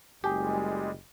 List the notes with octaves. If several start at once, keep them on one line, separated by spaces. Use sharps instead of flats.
F#1 G3 G#3 G4 G#4